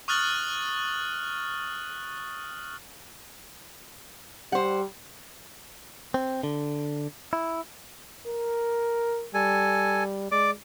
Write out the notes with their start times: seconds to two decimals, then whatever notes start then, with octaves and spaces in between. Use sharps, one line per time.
0.08 C#6 D#6 F6 F#6 A6 F#7
4.52 G3 C5 F#5
6.14 C4
6.43 D3
7.33 E4
8.27 A#4
9.34 G3 A4 G#5
10.32 G#3 D5 D6